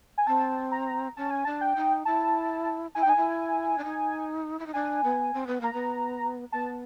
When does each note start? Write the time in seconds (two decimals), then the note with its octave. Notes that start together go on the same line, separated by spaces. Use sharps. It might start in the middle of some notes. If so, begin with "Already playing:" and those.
0.18 G#5
0.27 C4 A5
0.72 A#5
1.17 C#4 A5
1.31 G#5
1.45 D4 A5
1.61 G5
1.76 D#4
2.05 E4 A5
2.95 E4 G#5
3.03 G5
3.05 D#4 G#5
3.17 E4
3.78 D4
3.84 D#4
4.59 E4
4.66 D#4
4.74 D4 G#5
5.04 B3
5.34 C4
5.47 B3
5.61 A#3 A#5
5.73 B3
6.52 B3 A5